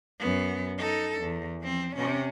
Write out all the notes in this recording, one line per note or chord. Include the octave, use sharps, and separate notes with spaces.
F#2 B3
D#4 A4
E2
F3 C4
C3 C#4